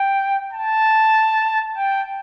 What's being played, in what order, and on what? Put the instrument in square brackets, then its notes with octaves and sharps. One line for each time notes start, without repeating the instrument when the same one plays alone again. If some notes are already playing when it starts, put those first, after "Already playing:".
Already playing: [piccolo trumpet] G5
A5
G5